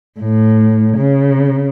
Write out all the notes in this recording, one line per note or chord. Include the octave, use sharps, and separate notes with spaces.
A2
C#3